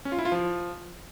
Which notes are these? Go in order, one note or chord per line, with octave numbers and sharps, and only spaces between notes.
C#4
F4
E4
F4
F3